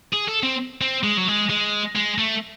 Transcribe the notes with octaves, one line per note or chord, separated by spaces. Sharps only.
G#4
A4
C4
C4
G#3
F#3
G#3
G#3
G#3
A3